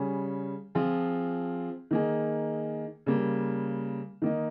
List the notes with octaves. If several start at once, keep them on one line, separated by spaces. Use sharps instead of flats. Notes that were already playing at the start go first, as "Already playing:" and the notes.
Already playing: C#3 G3 C#4 G#4
F3 C4 F4 G#4
D#3 A#3 D#4 G#4
C#3 G3 A#3
D#3 A#3 D#4